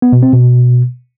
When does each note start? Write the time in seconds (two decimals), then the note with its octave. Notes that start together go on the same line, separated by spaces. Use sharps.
0.02 B3
0.12 B2
0.23 C4
0.33 B2